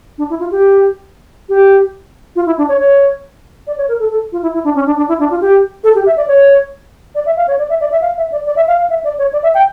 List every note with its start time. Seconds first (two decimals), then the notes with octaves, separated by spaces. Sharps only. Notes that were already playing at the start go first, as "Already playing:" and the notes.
0.18 D4
0.30 E4
0.40 F4
0.51 G4
1.49 G4
2.36 F4
2.46 E4
2.58 D4
2.69 C#5
2.79 C#5
3.67 D5
3.78 C#5
3.88 A#4
3.99 A4
4.10 A4
4.32 F4
4.42 E4
4.54 E4
4.64 D4
4.75 C#4
4.86 D4
4.97 D4
5.08 E4
5.20 D4
5.30 F4
5.41 G4
5.84 A4
5.95 G4
6.06 E5
6.17 D5
6.28 C#5
7.15 D5
7.26 E5
7.37 F5
7.48 C#5
7.58 D5
7.70 E5
7.80 D5
7.92 E5
8.01 F5
8.17 E5
8.32 D5
8.46 D5
8.56 E5
8.68 F5
8.78 F5
8.90 E5
9.04 D5
9.18 C#5
9.33 D5
9.43 E5
9.54 G5